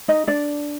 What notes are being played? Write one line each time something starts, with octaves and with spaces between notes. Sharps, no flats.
D#4 D#5
D4 D5